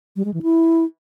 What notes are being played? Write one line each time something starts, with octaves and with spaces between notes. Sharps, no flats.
G3
G#3
E3
E4